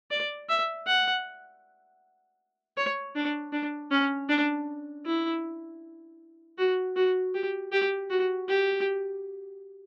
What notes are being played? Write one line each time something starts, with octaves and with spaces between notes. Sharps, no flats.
D5
E5
F#5
C#5
D4
D4
C#4
D4
E4
F#4
F#4
G4
G4
F#4
G4